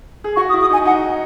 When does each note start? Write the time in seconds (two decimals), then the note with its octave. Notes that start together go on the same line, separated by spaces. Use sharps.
0.24 G#4
0.36 F#4 C#6
0.49 D#6
0.53 E4
0.61 D#6
0.70 D#4 G#5
0.85 D#4 F#5